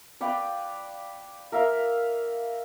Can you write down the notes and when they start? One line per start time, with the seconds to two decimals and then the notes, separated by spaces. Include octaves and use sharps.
0.21 B4 D5 F5 G5
1.52 A#4 E5 F5